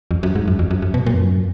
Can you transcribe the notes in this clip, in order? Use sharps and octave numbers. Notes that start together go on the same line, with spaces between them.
F2
F#2
G#2
F#2
F2
F#2
F#2
B2
A#2
F2
F#2